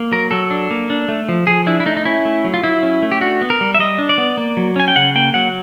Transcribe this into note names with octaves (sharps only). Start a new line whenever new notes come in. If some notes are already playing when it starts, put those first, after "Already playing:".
Already playing: A#3
F#3 A#4
F#3 A4
D4
A#3
D4
A3
F3
F3 G#4
D4 E4
E4
A3 D#4
D#4
C#4 E4
A3
F#3
F4
F#3 E4
C#4
A3
G4
D4 F#4
B3
A#4
G3
E5
G3 D#5
D4
D5
B3
A#3
F#3
C#4 G#5
G5
C#3 F#5
A#3 G5
F#3 F#5